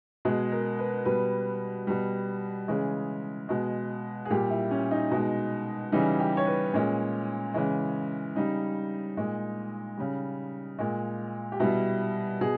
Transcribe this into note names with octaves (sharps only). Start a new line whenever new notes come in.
B2 G#3 G#4
A#4
B4
B2 G3 B4
B2 G3
C#3 E3 G#3 G#4
B2 G#3
G#4
A#2 G3 G4
E4
C#4
D#4
B2 G#3
C#3 E3 G3 D#4
G4
C#5
B4
A#2 G#3 C#4
C#3 E3 G#3
C#3 G3 D#4
A#2 G#3
C#3 G3
A#2 G#3
G4
B2 G3 E4
B2 G#4